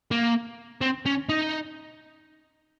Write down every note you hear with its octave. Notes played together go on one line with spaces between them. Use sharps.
A#3
C4
C#4
D#4